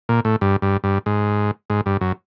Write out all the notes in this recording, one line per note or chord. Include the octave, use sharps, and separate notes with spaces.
A#2
A2
G2
G2
G2
G#2
G#2
G2
F#2